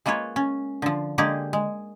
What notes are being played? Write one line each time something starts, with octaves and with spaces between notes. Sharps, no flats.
G#3 A#3 F4 B4 C#5
C#4
D3 F3
D3 G#3 A#3 G4 G#4
G#3